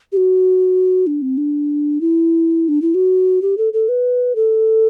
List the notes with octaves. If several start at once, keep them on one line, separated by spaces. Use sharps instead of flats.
G4
F#4
D4
C4
D4
E4
D4
E4
F#4
G4
A4
A4
B4
A4